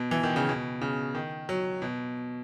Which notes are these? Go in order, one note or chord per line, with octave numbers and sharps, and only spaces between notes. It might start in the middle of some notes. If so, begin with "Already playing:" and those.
Already playing: B2
E3
D#3
C#3
B2
C#3
D#3
F#3
B2